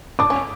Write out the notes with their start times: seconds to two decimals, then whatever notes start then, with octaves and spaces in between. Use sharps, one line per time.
0.19 D4 D6
0.30 C#4